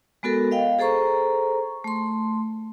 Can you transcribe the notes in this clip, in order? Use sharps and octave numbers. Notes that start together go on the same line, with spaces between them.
G#3 B3 F#4 A4 A#4
D#5 F5 G5
G#4 A4 C5 A#5 C#6
A3 C6